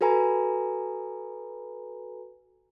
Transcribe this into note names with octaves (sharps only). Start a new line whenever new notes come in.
F#4 A4 B4 G#5 A#5 B5